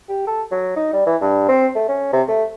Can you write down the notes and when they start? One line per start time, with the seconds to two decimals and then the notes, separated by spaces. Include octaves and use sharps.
0.09 G4
0.27 A4
0.51 F#3
0.76 D#4
0.93 G3
1.06 E3
1.21 G2
1.48 C4
1.75 A3
1.88 C#4
2.13 C3
2.28 A3